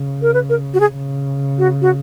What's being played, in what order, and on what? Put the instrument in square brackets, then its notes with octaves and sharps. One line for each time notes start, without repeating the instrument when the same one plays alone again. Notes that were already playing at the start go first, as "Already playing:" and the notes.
Already playing: [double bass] C#3
[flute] A#4
B4
A#4
F#4
G#4
[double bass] C#3
[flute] F#4
F#4